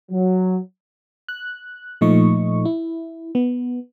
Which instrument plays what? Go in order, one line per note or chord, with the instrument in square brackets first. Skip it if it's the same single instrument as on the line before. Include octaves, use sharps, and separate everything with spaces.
[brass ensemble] F#3
[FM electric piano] F#6
A#2 F3 A3 D#4 D#5 C#6
E4
B3